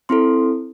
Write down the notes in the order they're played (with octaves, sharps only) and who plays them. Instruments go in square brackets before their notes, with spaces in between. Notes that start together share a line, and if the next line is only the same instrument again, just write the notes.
[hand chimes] C4 E4 A4 C6